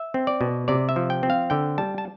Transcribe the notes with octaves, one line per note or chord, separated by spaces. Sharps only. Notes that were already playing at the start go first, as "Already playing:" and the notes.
Already playing: E5
C4
D5
B2
C3 D5
E5
F3
G5
C4
F5
D3 G5
G3 A5
A5